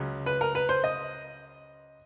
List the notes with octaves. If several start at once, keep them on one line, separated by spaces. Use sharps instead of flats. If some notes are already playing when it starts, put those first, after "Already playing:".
Already playing: C#2 C#3 F#3
B4
A#4
B4
C5
D#5